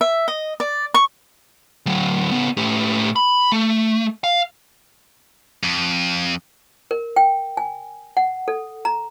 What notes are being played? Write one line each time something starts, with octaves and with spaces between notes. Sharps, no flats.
E5
D#5
D5
C#6
D2 F#3
C#3 B3
A2 G4
B5
A3
F5
F2
A#4
G5
G#5
F#5
A4
A#5